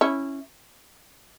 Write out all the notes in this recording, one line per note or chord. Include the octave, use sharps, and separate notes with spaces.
C#4 E4